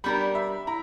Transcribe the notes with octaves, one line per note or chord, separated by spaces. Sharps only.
G3 B3 D4 G4 A#4 B5
E5
E4 A#5